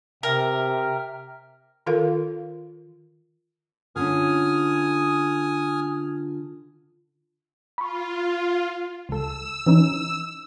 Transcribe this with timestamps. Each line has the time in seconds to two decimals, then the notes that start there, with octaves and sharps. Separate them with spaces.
0.23 C3 A#4 E5 G5 F6
1.86 D#3 F4 A4 A#4 F5
3.96 D3 C#4 F4 G#5 D#6 F6
7.78 F4 B5 C#6
9.09 C#2 A4 E6
9.66 E3 C#4 D#4